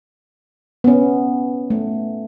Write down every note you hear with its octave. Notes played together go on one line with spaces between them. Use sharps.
B3 C#4
A3